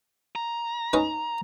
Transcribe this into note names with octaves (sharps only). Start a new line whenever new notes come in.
A#5
C#4 D#4 B4